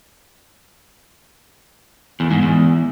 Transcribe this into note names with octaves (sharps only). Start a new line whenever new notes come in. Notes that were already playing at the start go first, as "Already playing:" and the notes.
E2
G#2
E2